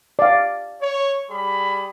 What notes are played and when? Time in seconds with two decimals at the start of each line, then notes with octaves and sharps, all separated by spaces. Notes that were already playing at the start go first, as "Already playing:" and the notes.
0.19 D5 F5
0.81 C#5
1.31 G3 G#4 B5